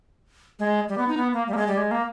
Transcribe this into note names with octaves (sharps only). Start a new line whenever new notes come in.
G#3
G3
B3
D#4
B3
A#3
G3
A#3
G#3
G3
G#3
A#3